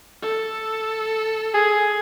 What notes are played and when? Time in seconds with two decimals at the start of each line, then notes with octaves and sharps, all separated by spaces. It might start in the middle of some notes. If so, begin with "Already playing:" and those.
0.22 A4
1.54 G#4